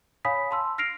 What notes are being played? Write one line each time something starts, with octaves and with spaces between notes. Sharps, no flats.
C#5 F5 G#5 B5 D#6 B6
A5 C6 E6
F6 A#6 C7 D7 F7